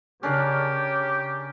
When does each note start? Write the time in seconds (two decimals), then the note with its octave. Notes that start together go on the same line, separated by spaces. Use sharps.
0.23 C#3 C#4 D4 G4 A#4